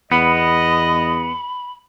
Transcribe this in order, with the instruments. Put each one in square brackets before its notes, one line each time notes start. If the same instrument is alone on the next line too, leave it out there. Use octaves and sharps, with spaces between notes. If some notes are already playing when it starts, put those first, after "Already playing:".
[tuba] E2 [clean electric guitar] B3 [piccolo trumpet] D#5 [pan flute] B5